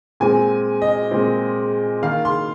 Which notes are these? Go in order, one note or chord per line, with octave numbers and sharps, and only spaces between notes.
A#2 G#3 C4 G#5
D#5
A#2 G#3 C4
D#3 A#3 F5
C6